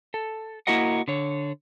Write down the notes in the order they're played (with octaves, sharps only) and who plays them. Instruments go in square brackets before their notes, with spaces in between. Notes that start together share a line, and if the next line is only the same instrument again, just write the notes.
[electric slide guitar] A4
A#3 E4 F#4 A#4 D#5 F#5
D3 C#5